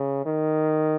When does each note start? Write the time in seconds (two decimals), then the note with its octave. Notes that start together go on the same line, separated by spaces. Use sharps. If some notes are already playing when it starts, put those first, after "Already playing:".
Already playing: C#3
0.26 D#3